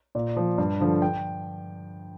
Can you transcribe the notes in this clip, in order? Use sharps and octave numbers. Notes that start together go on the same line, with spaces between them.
A#2 D5
F3
G2
D3 F3
G5